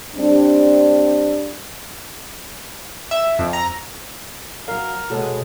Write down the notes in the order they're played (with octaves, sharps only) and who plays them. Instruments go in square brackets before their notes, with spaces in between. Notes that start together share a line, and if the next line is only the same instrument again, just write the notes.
[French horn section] G3 C4 D4
[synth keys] E5
F2
A#5
[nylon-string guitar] F#3 F5 [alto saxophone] A#4
[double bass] B2 G#3 [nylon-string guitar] F#4 A4 C#5